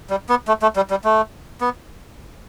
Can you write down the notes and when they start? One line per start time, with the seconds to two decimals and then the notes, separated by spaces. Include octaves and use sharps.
0.10 G3
0.29 B3
0.48 A3
0.62 A3
0.76 G3
0.91 G3
1.04 A3
1.61 B3